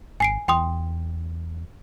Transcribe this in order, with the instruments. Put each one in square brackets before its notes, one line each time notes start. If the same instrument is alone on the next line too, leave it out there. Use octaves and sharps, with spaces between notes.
[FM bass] G#1 [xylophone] G#5 C7 D7
[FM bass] E2 [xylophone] G5 C6 D#6